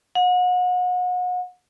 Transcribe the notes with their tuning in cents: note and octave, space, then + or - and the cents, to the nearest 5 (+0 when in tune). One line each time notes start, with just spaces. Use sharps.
F#5 -35